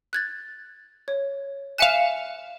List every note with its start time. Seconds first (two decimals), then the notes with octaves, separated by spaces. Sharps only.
0.13 F#6 G#6 A6
1.08 C#5
1.78 E5 F5 G#5 F#6 C#7 E7